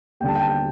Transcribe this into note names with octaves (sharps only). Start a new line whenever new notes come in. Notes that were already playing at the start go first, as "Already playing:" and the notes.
D#2 D3 G3 G5 A5
G5
A5
G5